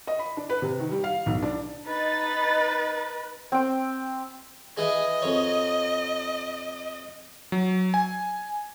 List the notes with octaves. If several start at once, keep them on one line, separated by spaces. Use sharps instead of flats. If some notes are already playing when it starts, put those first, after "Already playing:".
D#5
B5
D4
B4
C3
D#3
G3
F5
B1
D4
D#4 B4 A6
C4 G5
E3 G#4 D#5
F2 C#5
F#3
G#5